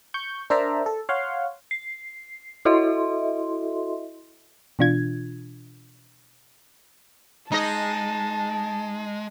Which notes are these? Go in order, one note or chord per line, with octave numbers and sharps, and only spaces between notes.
C#6 G6
D4 A#4 C5 D5 E5 A#5
A4
C#5 F5 F#5 C6
C7
E4 F#4 A4 D#5 E5 C6
B2 E3 D4 F4 G#6
G#3 D#4 D#5 A5